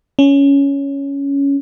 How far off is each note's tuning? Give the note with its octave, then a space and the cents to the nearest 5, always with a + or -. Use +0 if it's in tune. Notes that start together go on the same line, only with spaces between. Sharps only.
C#4 +10